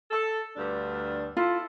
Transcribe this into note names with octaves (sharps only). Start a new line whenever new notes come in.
A4
D2 G2 D4
E4 F4 A4